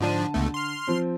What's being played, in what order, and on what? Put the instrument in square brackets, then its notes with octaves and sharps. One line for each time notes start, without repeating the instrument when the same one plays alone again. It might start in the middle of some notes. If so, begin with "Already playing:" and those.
[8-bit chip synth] G#2 F3 D4 [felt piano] D3 A5 D#7
[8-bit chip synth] C#2 B2 A3
C6 F6
[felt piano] F3 C4